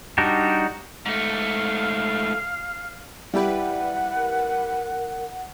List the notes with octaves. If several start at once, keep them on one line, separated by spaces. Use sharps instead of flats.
G3 D4 D#4 F#4 G4
G#2 A3 F5
G3 E4 G4 B4 D5 F#5
A#4